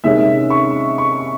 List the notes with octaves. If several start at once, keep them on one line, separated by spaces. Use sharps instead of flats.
C3 D#3 G#3 C#4 E5
C#6
C#6